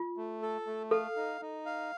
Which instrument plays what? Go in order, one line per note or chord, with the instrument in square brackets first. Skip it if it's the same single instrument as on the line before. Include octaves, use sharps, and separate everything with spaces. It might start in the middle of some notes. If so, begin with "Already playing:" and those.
Already playing: [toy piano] F4
[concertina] A3
A4
A3
[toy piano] A4 [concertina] F5
[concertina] D#4
D#4
F5